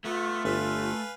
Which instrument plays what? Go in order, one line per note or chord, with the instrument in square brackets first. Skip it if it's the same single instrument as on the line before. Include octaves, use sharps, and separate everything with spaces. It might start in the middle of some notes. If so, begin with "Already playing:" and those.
[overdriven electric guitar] A3 [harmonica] B3 [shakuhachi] F4
[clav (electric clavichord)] G1 [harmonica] B4 F5 G#5